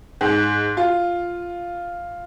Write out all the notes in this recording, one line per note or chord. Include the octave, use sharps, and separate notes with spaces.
G#2
F4